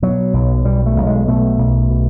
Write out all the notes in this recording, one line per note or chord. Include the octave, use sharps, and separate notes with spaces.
B2 F#3
B1
B2 G3
A3
B1
G#3
B2 A3
B1
B2